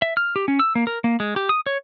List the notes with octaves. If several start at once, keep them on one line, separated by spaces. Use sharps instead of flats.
E5
F6
G4
C#4
E6
A#3
A#4
A#3
G#3
G4
D#6
C#5